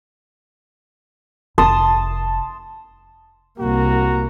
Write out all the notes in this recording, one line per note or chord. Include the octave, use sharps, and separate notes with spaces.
F1 A5 C6 D#6
C2 A#3 F#4 A#5